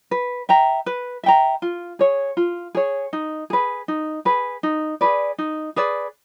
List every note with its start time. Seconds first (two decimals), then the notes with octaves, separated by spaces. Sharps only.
0.11 B4
0.49 E5 G5 A#5
0.86 B4
1.23 E5 G5 A#5
1.62 F4
1.99 G#4 C#5
2.37 F4
2.75 G#4 C#5
3.13 D#4
3.50 G#4 B4
3.88 D#4
4.25 G#4 B4
4.63 D#4
5.01 G#4 B4 D5
5.38 D#4
5.76 G#4 B4 D5